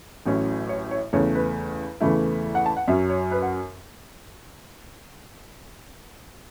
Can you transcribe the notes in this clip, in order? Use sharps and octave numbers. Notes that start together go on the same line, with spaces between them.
A1 A2 F#3 C#4
C#5
C#5
E2 C#3 A3 C#5
B4
E2 C#3 E3 A3 E4
F#5
A5
F#5
F#2 F#3 C#4 E5
C#5
B4
F#5